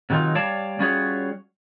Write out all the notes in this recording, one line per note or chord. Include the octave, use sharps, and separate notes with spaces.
C3 D#3 F#3 D#4 F4
G3 C#5 D5 F5 A5
G3 C#4 F4 F#4 G#4 C#5